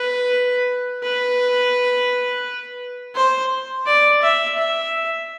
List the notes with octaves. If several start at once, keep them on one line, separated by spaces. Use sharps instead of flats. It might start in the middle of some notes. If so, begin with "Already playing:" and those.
Already playing: B4
B4
C5
D5
E5
E5